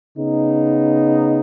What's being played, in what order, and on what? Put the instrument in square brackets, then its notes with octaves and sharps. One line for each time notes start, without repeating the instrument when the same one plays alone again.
[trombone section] C#3 B3 D#4